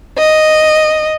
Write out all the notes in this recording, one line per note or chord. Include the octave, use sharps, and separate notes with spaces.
D#5